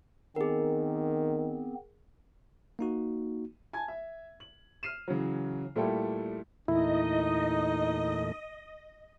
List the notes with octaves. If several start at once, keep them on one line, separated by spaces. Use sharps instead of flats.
D#3 B3 C4 G#4 A#4
A#3 D#4 F#4
G#5 A5 G#6
E5
F#7
F6 C7 D#7 E7
C#3 E3 F#3
A#2 G3 A3 E4 A4 G5
E2 A#2 A3 D#4 E4 D#5